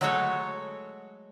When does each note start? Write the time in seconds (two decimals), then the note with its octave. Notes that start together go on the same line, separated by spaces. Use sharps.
0.01 F#3 G#3 A3 F#4 A4 C#5